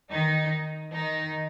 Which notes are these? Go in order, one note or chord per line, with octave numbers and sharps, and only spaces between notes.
D#3 D#4
D#3 D#4